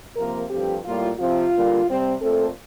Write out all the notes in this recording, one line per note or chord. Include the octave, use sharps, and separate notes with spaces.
C3 F3 A#3 A#4
G2 F3 A3 C4 G4
A2 G3 A#3 F4
C3 F3 C4 F4
D3 G3 A#3
C3 G3 C4
A#2 A3 C4 A4